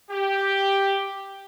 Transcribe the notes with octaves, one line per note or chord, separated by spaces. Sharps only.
G4